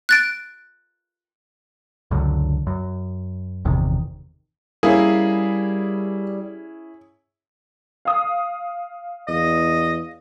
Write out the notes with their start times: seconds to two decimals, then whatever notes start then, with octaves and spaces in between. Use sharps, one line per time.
0.09 F#6 A6 D7
2.11 C#2 F#2 D3
2.67 F#2
3.65 G1 E2 C3 D#3
4.83 G3 A#3 C#4 E4 G#4
8.05 F5 D#6
9.28 E2 D#5